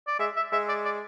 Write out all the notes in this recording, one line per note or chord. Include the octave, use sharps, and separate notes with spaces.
D5
G#3 E5
E5
G#3 E5
D5
D5